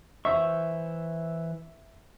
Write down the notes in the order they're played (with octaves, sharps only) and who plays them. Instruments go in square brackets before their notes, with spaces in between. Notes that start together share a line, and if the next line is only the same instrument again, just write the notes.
[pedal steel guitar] E3 C5 C#6 [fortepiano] E5